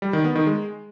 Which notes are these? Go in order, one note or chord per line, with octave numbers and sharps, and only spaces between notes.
G3
D#3
B3
D#3
G#3